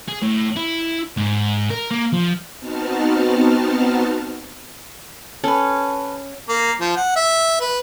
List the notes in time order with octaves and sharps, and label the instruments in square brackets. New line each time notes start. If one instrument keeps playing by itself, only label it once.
[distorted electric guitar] G#4
A2
E4
G#2
A#4
A#3
F3
[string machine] B3 C4 D#4 F#4 A5 F6
[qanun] C#4 [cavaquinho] A4 B4
[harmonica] A#3
F3
F#5
E5
B4